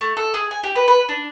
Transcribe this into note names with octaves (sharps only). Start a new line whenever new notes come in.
A3
A4
G#4
G#5
G4
B4
B4
D4